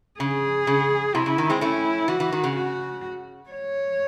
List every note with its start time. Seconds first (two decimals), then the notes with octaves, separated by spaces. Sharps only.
0.20 C#3 G#4
0.67 C#3
1.15 C3 E4
1.26 C#3
1.38 D#3
1.50 G#3 C4
1.61 A3 C#4 E4
2.08 E3 F#4
2.20 E3
2.32 D#3
2.44 C#3
2.56 F#4
3.50 C#5